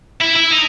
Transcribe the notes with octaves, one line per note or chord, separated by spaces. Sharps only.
E4
E4
D#4